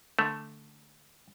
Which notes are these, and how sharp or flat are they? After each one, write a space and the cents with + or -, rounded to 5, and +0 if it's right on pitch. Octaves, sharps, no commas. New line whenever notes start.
D3 +0 A3 +0